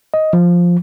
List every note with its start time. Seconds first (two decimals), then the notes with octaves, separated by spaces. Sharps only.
0.14 D#5
0.33 F3